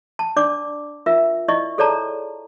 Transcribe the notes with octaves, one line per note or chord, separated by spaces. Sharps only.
A5
D4 D5 D6
F4 A#4 E5
E4 D5 D#5 C#6
G#4 A4 C#5 D5 A5 A#5